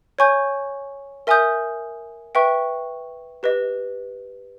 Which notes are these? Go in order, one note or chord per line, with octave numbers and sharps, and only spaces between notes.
C#5 G#5 C#6 G6
A#4 E5 G#5 D#6 G6
B4 E5 G5 C#6
G4 B4 D#5